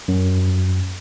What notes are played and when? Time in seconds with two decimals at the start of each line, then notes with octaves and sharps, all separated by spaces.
0.08 F#2